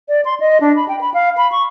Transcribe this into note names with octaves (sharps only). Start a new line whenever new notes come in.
D5
C6
D#5
D4
B5
G5
B5
F5
B5
C#6